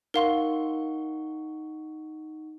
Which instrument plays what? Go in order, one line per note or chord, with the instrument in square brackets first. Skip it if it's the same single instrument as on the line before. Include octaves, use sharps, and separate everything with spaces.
[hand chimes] D#4 F#5 C#6 [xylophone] A#4 F5 C6